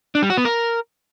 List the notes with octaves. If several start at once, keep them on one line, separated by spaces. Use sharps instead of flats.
D4
G3
F#4
B3
A#4